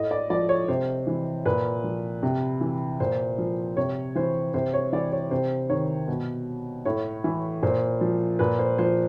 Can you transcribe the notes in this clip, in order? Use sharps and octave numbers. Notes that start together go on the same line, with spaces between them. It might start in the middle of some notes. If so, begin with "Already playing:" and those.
Already playing: A2 D#5
D5
F3 D5
C#5
C3 C5
E3
A#2 B4
F3
C3
E3
A#2 C5
F3
C3 C#5
E3 C5
C3 C5
C#5
E3 D5
C#5
C3 C5
D#3 C#5
B2
A2 C#5
E3
A#2 C5
F3
A#2 B4
C5
F3 C5